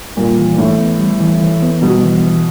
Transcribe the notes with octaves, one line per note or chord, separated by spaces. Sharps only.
A#2 G3
E3
A2 E3
B3
G3
E3
E3
B3
B2 G3
E3
E3